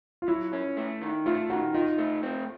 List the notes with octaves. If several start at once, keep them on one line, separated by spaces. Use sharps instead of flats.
F4
F#3 E4
C#4
A3
D#3
A3 F4
D#3 F#4
D#4 F4
A3
C4